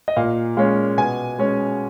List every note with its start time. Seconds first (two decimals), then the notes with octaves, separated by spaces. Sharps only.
0.08 D#5
0.16 A#2 F5
0.57 G#3 C#4 F5
0.97 B2 G#5
1.39 G#3 C#4